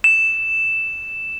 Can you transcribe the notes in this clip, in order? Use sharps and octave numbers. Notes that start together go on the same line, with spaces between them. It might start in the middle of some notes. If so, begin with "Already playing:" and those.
E7